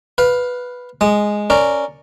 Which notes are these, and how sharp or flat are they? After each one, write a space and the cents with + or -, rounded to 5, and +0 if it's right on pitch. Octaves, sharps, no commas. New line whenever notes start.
B4 +0 F5 +15
G#3 +0 D#6 -20
C#4 +0 A#4 -10 D5 +0